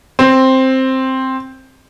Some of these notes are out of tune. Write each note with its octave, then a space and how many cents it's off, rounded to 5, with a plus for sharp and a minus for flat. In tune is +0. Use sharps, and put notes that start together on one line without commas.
C4 +5